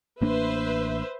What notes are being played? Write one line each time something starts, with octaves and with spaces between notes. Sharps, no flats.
A1 A#3 D4 B4 C5 E5